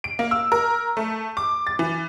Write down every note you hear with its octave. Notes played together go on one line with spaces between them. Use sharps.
D7
A#3
E6
A#4
A3
D6
A6
E3